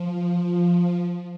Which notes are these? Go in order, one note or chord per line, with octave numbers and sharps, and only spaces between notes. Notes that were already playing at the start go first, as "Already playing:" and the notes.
Already playing: F3